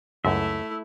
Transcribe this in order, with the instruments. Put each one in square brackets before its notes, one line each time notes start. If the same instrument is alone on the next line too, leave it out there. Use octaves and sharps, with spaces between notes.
[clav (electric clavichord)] C#2 F#2 [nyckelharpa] A3 E4 [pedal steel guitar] E5